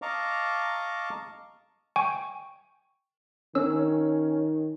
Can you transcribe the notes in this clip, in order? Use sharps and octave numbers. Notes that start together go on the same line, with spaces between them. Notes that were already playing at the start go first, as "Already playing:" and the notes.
D#5 F5 A5 A#5 C#6 D6
G5 G#5 C#6
D#3 C#4 E6